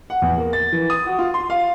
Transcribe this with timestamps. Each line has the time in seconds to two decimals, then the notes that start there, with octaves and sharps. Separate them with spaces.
0.10 F#5
0.22 E2
0.38 A#3
0.53 A6
0.72 E3
0.90 D#6
1.06 F#4
1.19 F4
1.34 C6
1.50 F5